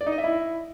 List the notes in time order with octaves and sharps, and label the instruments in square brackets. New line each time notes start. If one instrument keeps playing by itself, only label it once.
[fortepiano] D5
D#4
D#5
E5
E4